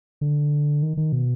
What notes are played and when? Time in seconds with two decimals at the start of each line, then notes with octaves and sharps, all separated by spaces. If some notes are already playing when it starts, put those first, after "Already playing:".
0.21 D3
0.83 D#3
0.97 D#3
1.12 B2